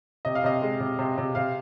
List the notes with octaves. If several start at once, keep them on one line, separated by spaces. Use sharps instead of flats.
C3 D#5
F5
C3 D#5
G#3
C3
C3
C3
C3 F5